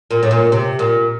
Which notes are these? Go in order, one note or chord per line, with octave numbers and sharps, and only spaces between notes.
A#2
A2
A#2
C3
A#2